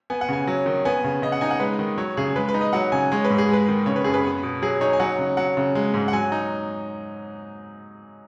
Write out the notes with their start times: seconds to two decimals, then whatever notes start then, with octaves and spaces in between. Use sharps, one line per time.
0.10 B3 G#5
0.21 F#5
0.29 C#3 G#5
0.47 F#3
0.66 D#3
0.85 B3 G#5
1.04 C#3
1.22 C#3 D#5
1.32 F#5
1.41 D#4 G#5
1.51 F#5
1.60 G#3 B4
1.79 D#3
1.98 F#3 C#5
2.17 C#3 G#4
2.36 G#3 B4
2.49 B4
2.54 D#4
2.61 D#5
2.73 F#3 F#5
2.92 C#3 G#5
3.12 G#3 C#5
3.25 B4
3.30 G#2
3.38 G#4
3.49 G#3 B4
3.68 D#3
3.86 C#3 C#5
3.96 B4
4.04 F#2 G#4
4.14 B4
4.25 B3
4.43 B2
4.62 F#3 G#4
4.81 D#4 C#5
4.93 G#5
5.00 F#3 F#5
5.19 C#3
5.37 F#3 F#5
5.57 C#3
5.75 G#3
5.94 G#2
6.08 F#5
6.13 F#3 G#5
6.32 D#4